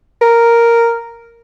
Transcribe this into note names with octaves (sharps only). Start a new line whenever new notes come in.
A#4